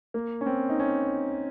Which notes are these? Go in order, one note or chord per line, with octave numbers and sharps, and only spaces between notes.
A#3
C#4
C4
D#4
C#4